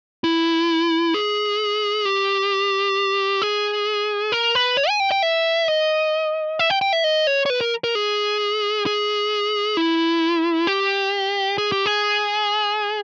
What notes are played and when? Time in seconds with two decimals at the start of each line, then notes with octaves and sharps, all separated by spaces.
0.24 E4
1.14 G#4
2.05 G4
3.42 G#4
4.32 A#4
4.55 B4
4.77 C#5
4.89 G#5
5.00 G5
5.12 G5
5.22 E5
5.68 D#5
6.59 E5
6.70 G5
6.82 G5
6.93 E5
7.04 D#5
7.27 C#5
7.46 C#5
7.50 B4
7.61 A#4
7.84 A#4
7.95 G#4
8.86 G#4
9.77 E4
10.67 G4
11.58 G#4
11.72 G4
11.86 G#4